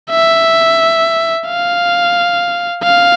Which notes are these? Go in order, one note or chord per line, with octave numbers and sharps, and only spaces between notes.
E5
F5
F5